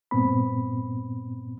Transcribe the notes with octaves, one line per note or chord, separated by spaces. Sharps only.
G2 A#2 B3 C4 B5